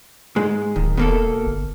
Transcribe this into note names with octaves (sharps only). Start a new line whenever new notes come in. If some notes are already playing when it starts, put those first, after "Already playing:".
G#2 G#3
D1 D#3
E1 B2 A#3 A4
G1